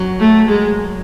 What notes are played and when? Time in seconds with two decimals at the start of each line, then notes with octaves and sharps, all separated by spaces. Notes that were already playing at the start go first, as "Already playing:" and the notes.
Already playing: F#2 F#3
0.20 A3
0.48 G#3